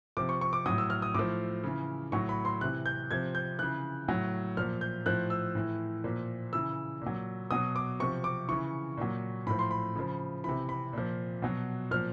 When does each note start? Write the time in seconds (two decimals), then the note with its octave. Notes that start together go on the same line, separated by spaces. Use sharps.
0.17 C3 F3 D6
0.29 C#6
0.41 C#6
0.53 D6
0.66 A2 F#3 D#6
0.78 E6
0.90 F6
1.02 D#6
1.14 A2 F3 D6
1.63 C#3 E3
2.12 A2 F#3 C#6
2.29 B5
2.45 C6
2.61 C3 E3 F#6
2.86 G6
3.11 C3 F3 G#6
3.35 G6
3.59 C#3 E3 F#6
4.08 A2 F#3
4.57 A#2 F3 F6
4.81 G6
5.06 A2 F3 F#6
5.30 E6
5.55 A2 E3
6.04 A#2 F3
6.53 C#3 E3 E6
7.01 A#2 F#3
7.51 B2 F#3 D#6
7.76 D6
8.00 C3 F3 C#6
8.24 D6
8.48 C#3 E3 C#6
8.97 A#2 F#3
9.47 A2 F3 B5
9.59 C6
9.71 B5
9.95 C#3 F3
10.44 C3 E3 B5
10.69 B5
10.93 A#2 F3
11.42 B2 F#3
11.91 A#2 F3 F6